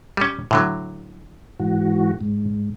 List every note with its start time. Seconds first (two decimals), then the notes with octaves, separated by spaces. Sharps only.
0.17 G3 C#4
0.51 A2 D3 F#3
1.59 G#2 E3 F#4
2.21 G#2